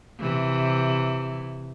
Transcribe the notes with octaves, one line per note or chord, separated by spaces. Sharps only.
C3 E3